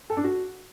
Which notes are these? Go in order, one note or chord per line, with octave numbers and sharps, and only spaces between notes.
A4
D4
F#4